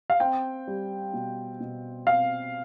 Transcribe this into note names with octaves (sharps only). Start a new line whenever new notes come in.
F5
C4 G5
G3
B2
B2
C4 F5